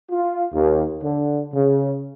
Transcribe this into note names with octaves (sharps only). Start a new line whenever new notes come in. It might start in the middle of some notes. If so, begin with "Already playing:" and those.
F4
D#2
D3
C#3